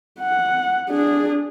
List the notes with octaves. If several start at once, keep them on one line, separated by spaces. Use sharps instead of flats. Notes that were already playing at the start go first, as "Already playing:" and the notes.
F#5
D4 G#4